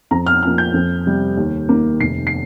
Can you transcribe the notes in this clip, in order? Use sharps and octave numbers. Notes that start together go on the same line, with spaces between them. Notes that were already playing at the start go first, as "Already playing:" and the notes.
F2 A#5
F6
F3 A#3 F6
G6
F2
C3 G3
D#2
D#3 A#3
F1 C7
C7